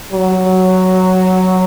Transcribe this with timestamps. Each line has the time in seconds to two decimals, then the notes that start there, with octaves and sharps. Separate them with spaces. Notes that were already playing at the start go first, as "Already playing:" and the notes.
0.12 F#3